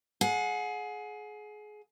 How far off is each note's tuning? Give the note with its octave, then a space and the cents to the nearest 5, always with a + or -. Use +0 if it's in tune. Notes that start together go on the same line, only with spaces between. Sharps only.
G#4 +25 F#5 -25